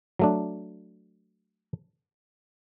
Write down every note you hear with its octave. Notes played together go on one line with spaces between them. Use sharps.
F#3 A3 D4